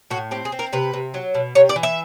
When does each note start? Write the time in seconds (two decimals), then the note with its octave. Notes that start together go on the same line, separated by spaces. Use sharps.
0.11 A2 F#4
0.31 C4 G4
0.45 G#4
0.52 C4
0.59 A#4
0.73 C3 B4
0.93 C3
1.14 F#3
1.34 B2
1.55 C3 C#5
1.69 D5
1.76 E3
1.83 E5